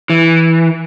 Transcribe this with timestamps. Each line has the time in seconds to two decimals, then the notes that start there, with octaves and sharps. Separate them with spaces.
0.10 E3